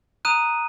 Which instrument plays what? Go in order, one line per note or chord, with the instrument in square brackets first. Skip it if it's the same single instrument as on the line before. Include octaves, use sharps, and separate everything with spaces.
[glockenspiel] A#5 D#6 F#6 D#7